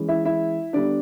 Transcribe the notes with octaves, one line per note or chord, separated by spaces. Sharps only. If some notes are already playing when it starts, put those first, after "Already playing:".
Already playing: E3 G#3 C#4
E4 E5
E4 E5
D3 G3 B3 D4 D5